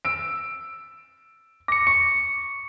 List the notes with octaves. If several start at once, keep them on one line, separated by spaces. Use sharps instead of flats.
E6 D7
D6 A#6 C#7
C#6 C#7